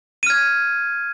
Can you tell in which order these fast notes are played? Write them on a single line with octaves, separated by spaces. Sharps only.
D#7 F6 G#6